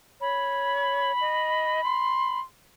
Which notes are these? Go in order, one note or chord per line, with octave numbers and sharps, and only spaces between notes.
C#5 B5
D#5
C6